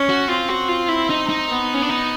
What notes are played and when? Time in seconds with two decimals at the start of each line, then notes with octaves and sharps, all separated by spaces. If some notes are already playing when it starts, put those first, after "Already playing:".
Already playing: C#4
0.10 F#4
0.29 C4 F4
0.49 F#4
0.69 F4
0.89 E4
1.10 D#4
1.29 D#4
1.49 B3
1.74 C#4
1.82 D4
1.89 D#4